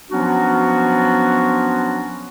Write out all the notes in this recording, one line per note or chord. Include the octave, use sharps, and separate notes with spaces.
F3 F#3 B3 C#4 D4 F#4